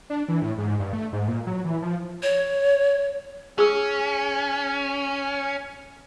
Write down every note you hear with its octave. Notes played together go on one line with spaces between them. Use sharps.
D4
E3
A2
G#2
G2
A3
G#2
A#2
F#3
E3
F3
C#5
C#4 G#4 E6